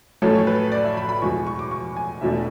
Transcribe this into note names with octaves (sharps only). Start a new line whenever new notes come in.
A1 A2 F#3 A3 C#4 A4
C#5
B4
D5
E5
B5
B5
E2 B2 G#3 C#6
C#6
D6
C#6
G#5
E1 E2 B2 A3 D4 E5